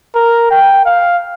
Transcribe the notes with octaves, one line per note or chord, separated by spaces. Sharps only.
A#4
G5
F5